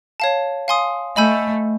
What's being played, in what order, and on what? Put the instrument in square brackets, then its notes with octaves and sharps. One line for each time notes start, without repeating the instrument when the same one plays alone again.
[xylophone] C#5 F5 A5
F5 G#5 C6 D#6
[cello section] A3 [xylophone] D#5 G#5 B5 E6 G6